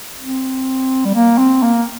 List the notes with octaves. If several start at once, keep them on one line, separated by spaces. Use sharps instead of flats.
C4
G3
A#3
C4
A#3